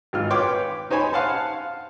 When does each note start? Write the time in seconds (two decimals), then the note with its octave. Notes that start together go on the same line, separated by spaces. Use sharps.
0.13 G#1 F4 F6
0.30 B4 C#5 G5 C6 D6
0.91 D#4 C5 C#5 G#5 B5
1.13 F5 F#5 A5 C6